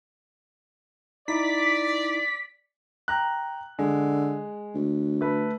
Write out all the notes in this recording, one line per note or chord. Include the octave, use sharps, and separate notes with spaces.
D#4 E4 D5 B6
G5 A#5 F#6
D3 G#3
D2
A3 B4